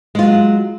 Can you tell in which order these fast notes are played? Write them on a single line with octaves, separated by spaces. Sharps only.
G#3 F4 F#3